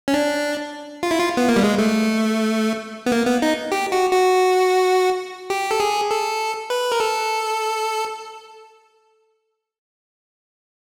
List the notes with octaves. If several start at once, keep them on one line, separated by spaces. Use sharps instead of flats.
C#4
D4
F4
E4
F4
B3
A#3
G3
G#3
A3
B3
A#3
B3
D#4
G4
F#4
F#4
G4
A4
G#4
A4
B4
A#4
A4